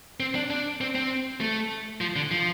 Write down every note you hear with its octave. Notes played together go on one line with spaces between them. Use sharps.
C4
D4
D4
C4
C4
A3
F3
D3
F3